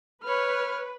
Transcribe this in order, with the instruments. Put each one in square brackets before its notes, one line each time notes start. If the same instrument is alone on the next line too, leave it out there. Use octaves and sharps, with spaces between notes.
[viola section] B4 [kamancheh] C#5 F6